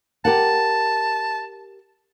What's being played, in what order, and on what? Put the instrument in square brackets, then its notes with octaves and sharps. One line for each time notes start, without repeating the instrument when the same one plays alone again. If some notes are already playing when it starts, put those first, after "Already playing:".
[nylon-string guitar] G4 A#4 F#5 [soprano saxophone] A5